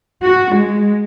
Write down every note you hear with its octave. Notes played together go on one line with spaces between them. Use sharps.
F#4
G#3